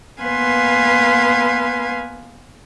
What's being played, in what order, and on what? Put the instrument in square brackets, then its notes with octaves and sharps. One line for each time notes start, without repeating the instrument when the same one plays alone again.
[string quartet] A#3 B3 B4 F5 G#5 C6